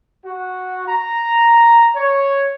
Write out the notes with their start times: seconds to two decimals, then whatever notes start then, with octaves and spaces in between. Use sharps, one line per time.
0.25 F#4
0.87 A#5
1.95 C#5